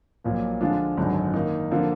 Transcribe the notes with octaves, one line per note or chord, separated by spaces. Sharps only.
B1 A#2 F3 A#3
D3 F3 G#3 D4 F4
G#1 F#2 D3 G#3 D#4
D#3 A#3 D#4
D3 F3 A#3 F4